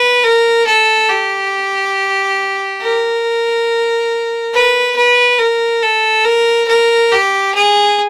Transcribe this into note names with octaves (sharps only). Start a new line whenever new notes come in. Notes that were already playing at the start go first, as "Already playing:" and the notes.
Already playing: B4
A#4
A4
G4
A#4
B4
B4
A#4
A4
A#4
A#4
G4
G#4